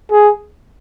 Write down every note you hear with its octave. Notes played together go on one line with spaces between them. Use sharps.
G#4